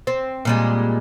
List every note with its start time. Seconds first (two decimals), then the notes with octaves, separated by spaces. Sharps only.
0.07 C4
0.45 A#2 G3 G#3